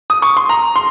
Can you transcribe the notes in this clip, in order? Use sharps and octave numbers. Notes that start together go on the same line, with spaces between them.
D#6
C#6
C6
A#5
C6